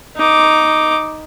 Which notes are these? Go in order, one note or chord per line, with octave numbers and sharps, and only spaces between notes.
D#4 D6